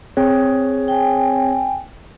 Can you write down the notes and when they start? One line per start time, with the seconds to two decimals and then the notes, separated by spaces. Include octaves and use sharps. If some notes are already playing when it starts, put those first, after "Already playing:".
0.17 C4 G#4 C#5
0.88 G5 G#5